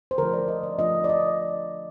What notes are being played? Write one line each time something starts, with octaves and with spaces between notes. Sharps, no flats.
C5
D3 F3 A3 D4 F4 A#4
D5
D#5
D5
D3 F3 A3 D4 F4 D#5
D5
D#5